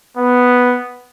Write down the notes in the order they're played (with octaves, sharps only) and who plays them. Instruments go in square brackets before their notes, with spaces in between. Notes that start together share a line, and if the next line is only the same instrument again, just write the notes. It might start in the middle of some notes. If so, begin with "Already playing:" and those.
[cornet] B3